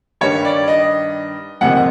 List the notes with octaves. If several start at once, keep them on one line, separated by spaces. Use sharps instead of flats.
G2 D#3 G3 C#5
D5
D#5
F2 C3 D#3 G#3 F#5